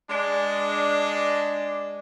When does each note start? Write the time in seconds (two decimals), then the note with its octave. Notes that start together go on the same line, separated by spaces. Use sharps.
0.10 G#3 D4